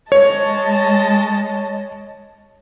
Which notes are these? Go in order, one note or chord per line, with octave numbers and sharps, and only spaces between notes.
G#3 C#5 D#5 A5